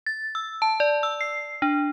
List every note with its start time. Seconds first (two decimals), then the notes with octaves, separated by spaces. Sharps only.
0.06 A6
0.35 E6
0.62 A5
0.80 D5
1.03 E6
1.21 C7
1.62 D4